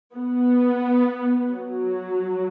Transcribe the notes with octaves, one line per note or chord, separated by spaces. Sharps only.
B3
F#3